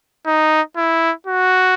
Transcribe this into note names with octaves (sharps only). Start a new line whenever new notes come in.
D#4
E4
F#4